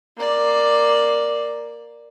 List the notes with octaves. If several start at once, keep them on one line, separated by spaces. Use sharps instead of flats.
A#3 D5